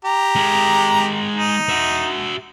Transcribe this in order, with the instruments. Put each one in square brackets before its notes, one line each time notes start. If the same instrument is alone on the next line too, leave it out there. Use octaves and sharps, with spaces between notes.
[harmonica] G4 A#5
[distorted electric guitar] G#3 A#4
[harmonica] D#4
[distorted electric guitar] F#4 E5